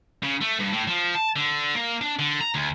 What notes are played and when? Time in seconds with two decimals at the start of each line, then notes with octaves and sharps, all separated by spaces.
0.23 C#3
0.41 A3
0.59 G2
0.72 A2
0.87 F3
1.15 A5
1.36 D3
1.75 A#3
2.01 D4
2.19 D3
2.41 A#5
2.55 D2